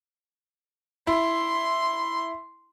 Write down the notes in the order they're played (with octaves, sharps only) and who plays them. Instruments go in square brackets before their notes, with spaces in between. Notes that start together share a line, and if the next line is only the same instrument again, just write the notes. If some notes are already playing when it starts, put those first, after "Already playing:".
[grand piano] E4 [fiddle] C6